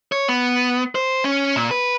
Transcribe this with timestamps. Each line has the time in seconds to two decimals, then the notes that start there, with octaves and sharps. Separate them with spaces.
0.12 C#5
0.28 B3
0.95 C5
1.24 C#4
1.56 A#2
1.71 B4